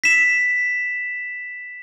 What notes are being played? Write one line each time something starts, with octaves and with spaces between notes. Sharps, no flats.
B6 E7